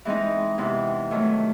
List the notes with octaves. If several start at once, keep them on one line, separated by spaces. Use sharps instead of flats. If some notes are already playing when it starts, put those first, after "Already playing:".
E3 G#3 C4 D#4
E2 C3 E3
E2 D#3 F#3 A3